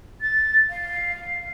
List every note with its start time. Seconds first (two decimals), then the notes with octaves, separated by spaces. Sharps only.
0.21 A6
0.70 F5